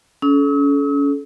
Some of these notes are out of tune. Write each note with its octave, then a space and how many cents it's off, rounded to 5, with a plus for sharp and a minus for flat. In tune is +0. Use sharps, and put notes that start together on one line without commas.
C#4 +30 A4 -35 E6 -45